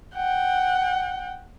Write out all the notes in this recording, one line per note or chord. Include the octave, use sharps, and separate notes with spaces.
F#5 G5